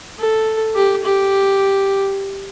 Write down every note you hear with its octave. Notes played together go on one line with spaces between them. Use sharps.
A4
G4
G4